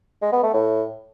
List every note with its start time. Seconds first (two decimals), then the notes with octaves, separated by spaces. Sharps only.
0.22 G#3
0.33 B3
0.43 A3
0.54 A2